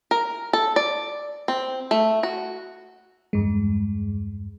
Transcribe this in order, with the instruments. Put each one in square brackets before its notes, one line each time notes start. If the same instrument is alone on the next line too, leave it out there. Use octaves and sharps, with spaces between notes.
[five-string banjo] A#4
A4
D5
C4
A3
F#4
[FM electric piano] E2 G2 G#3